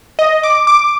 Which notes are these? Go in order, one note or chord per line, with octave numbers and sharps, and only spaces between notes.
D#5
D6
D6